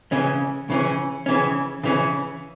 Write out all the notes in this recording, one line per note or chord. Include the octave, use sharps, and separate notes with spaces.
C#3 E3 C#4
C#3 E3 C#4
C#3 E3 C#4
C#3 E3 C#4